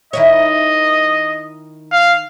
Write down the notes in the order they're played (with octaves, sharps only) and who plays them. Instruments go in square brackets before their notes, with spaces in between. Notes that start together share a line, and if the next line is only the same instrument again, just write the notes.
[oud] D#3 E4 C#5 [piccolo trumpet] D#5
[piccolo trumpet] F5